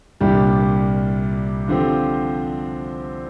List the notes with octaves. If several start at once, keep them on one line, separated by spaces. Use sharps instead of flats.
C2 A#2 G3 D4 G4
D3 F3 C4 G4